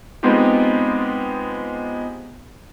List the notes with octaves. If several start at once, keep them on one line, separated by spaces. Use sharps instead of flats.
G#3 B3 C4 D#4 F4 G4